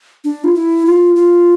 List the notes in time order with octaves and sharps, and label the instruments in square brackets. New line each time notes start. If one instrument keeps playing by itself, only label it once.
[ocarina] D4
F4
E4
F4
F4